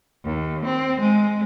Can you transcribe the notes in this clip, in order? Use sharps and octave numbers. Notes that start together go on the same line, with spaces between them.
D#2
C4
G#3